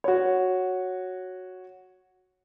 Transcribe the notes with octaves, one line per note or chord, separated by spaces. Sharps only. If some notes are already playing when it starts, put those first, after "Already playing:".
F#4 C#5